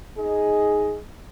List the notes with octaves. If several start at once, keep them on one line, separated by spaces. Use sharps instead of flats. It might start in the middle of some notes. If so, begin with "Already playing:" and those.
D#4 G#4 D#5